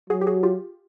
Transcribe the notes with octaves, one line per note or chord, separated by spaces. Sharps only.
F#3 F#4 G#4
G4
F#4 G#4
F4 G4